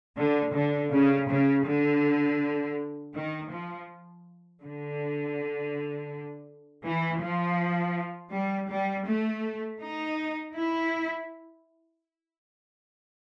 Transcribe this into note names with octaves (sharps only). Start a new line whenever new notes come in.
D3
D3
C#3
C#3
D3
D#3
F3
D3
E3
F3
G3
G3
A3
D#4
E4